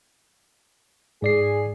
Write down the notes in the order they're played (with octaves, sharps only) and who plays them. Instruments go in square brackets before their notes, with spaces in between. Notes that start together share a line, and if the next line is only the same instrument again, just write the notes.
[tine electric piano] G#2 D5 C7 [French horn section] G#4